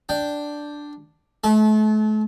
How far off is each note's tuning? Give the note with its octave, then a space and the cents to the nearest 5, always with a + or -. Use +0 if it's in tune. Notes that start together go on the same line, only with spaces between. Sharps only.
D4 +0 G5 +0
A3 -40 A5 -30